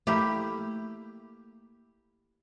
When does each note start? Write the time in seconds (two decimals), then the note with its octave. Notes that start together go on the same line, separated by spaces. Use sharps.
0.07 A3 A#3 E4 G4